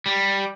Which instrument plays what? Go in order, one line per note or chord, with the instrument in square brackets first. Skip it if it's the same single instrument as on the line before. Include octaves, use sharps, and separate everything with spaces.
[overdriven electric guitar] G3